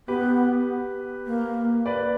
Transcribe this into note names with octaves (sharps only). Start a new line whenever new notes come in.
B3 G4 B4
A#3
B4 D5